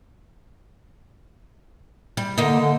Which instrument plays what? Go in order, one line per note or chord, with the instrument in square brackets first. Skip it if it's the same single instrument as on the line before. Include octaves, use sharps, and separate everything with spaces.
[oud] G3
[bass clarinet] D3 [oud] A#3 D#4
[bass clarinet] D3